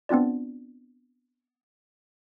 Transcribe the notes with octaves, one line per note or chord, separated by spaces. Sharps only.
B3 C4 D4 F4 D5